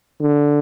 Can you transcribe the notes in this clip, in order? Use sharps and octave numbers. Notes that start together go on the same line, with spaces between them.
D3